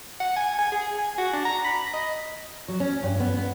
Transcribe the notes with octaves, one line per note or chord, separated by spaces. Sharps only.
F#5
G#5
G#5
G#4
G#5
F#4
D4
A#5
B5
D#5
F#3
C#4
G2
B3
B3